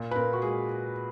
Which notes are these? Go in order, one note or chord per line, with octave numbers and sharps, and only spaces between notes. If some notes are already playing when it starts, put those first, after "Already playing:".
Already playing: A#2
B4
A#2 A#4
F#4
G#3 G#4